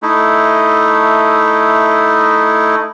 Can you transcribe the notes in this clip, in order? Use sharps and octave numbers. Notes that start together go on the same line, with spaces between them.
A3 D#4 E4